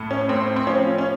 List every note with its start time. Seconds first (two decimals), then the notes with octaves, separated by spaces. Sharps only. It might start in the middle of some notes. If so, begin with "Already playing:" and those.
Already playing: A2
0.11 C#4
0.29 A2 C4
0.56 C4
0.67 F3 C#4
0.98 C#4